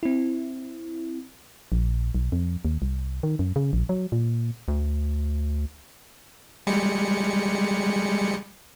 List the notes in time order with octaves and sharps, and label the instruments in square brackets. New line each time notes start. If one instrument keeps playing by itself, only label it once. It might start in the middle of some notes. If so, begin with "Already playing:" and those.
[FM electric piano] C4 E4
[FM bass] A#1
B1
F2
D#2
C2
D#3
F#2
C#3
A#1
F#3
A#2
[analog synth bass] D2
[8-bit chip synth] G3 G#3 C#7